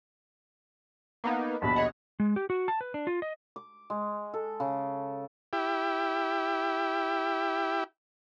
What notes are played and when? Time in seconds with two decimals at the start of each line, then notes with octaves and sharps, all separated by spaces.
1.24 A#3 B3 D#4
1.62 A#1 D#2 B2 A5 B5
1.76 G#4 C#5 D#5 F#5
2.20 G#3
2.36 G4
2.50 F#4
2.68 A5
2.81 B4
2.94 D4
3.07 F4
3.22 D#5
3.56 D6
3.90 G#3
4.34 A4
4.60 C#3
5.53 E4 G4